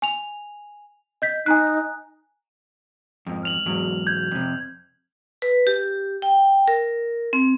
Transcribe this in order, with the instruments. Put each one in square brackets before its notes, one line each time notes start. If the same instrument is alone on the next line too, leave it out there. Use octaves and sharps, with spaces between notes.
[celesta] G#5 F7
D#5 G6 B6
[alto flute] D#4 [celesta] G#5 A#5 F#6
[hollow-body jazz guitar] F2 G#2
[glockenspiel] F6 F7 F#7
[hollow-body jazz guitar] E2 G#2 F#3
[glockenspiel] G6 G#6
[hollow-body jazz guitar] F2 C3
[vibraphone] B4
G4
G5
A#4
C4